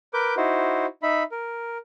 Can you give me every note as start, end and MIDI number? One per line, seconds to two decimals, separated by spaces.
0.14 0.35 70
0.14 0.35 71
0.14 0.35 86
0.14 0.35 91
0.37 0.86 63
0.37 0.86 64
0.37 0.86 66
0.37 0.86 72
1.03 1.23 63
1.03 1.23 76
1.03 1.23 83
1.32 1.78 70